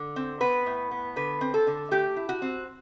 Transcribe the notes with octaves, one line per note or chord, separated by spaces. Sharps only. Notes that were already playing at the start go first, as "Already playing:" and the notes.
Already playing: D3
C4
B3 B4
A2
B3
D3 B4
C4
A4
D3
A3 G4
E4
F#4
C4